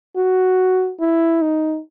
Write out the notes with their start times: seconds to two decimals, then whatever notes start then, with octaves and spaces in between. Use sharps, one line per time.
0.16 F#4
1.00 E4
1.41 D#4